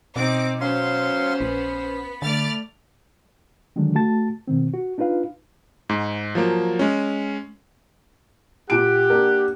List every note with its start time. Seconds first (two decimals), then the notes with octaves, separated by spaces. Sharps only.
0.16 B2 C4 D#4 D6
0.61 F#3 B3 C#4 C5 F5 C6
1.41 A#1 B5
2.22 D3 A3 D5 F6 A6
3.76 D3 D#3 F#3 G#3 D4
3.95 A3 F#4 A5 A6
4.48 B2 D#3 C4
4.73 F#4
4.98 D4 D#4 F4 B4 F5
5.89 G#2
6.35 F3 F#3 A#3
6.79 G#3 C#4
8.70 A#2 G4 F#5 D7
9.10 A#3 D4 A#4